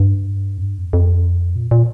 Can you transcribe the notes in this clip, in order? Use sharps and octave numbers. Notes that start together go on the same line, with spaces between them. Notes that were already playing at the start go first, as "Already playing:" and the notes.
Already playing: G2
F2
G2
F2
F2
A#2
A#2